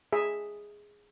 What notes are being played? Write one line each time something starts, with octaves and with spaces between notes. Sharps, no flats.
G#4 E5